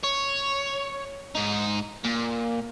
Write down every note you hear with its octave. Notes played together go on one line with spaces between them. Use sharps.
C#5
G#2 D#4
A#2